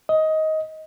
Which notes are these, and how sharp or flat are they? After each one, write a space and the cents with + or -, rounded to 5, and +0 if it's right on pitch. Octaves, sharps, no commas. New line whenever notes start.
D#5 +15